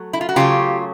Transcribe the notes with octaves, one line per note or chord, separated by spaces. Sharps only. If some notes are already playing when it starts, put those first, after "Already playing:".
Already playing: F#3 A3
E4
F4
F#4
C#3 F#3 A3 F4 G4